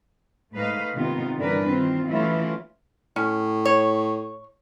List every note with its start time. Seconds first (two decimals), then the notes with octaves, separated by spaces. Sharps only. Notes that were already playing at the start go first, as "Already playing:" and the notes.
0.54 G#2 A3 B4 D#5 F5
0.96 C3 D#3 B3 D#4 F4
1.38 G2 D3 E3 D4 A#4 B4
1.70 D#3 C4 F4
2.07 E3 F#3 A3 C#4 E4 F4
3.16 A2 C#4
3.65 C#5